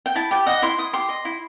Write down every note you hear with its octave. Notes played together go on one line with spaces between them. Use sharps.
G5
E4 A5
G4 G5
D#5 F#5
E4 C6
E4 D#6
G4 C6
D#5
E4